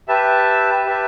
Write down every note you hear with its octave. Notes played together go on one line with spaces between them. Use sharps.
G4 B4 E5 A5
G4 B4 E5 A5